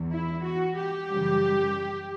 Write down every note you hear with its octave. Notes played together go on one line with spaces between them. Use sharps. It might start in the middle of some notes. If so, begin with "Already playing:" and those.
Already playing: E2
E4
F#4
G4
F#2 C#3 E3 G3